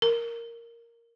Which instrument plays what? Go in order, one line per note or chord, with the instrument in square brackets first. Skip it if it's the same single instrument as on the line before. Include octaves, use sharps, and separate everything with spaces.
[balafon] A#4